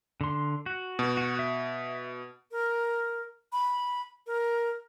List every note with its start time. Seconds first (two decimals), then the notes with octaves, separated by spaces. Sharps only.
0.21 D3 C6
0.66 F#4
0.99 B2
1.17 F#4
1.39 E5
2.51 A#4
3.52 B5
4.27 A#4